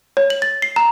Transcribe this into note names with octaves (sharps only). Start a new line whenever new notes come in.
C#5
F#7
A6
C7
A#5